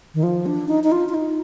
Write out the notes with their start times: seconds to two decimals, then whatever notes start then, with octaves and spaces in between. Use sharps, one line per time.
0.14 D#3
0.23 F3
0.46 D4
0.68 D#4
0.84 D#4
0.92 F4
1.09 F4
1.14 D#4